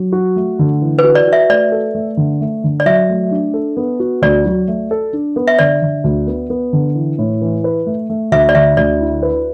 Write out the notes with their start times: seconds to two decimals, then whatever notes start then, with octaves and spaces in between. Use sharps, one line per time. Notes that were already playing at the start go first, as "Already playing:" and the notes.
Already playing: F#3
0.13 F#4
0.36 A3
0.59 D3
0.82 E3
0.99 B4
1.04 F#4
1.15 D5
1.27 F#4
1.33 E5
1.49 A3 D5
1.72 A4
1.95 A3
2.17 D3
2.41 A3
2.64 D3
2.80 D5
2.86 F#3 E5
3.09 A3
3.31 D4
3.54 A4
3.77 B3
4.00 F#4
4.22 D2 D5
4.46 F#3
4.68 A3
4.91 A4
5.13 D4
5.36 B3
5.48 E5
5.59 D3 D5
5.82 D3
6.04 D2
6.27 B3
6.50 B3
6.73 D3
6.95 E3
7.18 A2
7.42 E3
7.64 B4
7.86 A3
8.10 A3
8.32 D2 E5
8.49 D5
8.55 D3 E5
8.77 D2 D5
9.00 E4
9.23 B4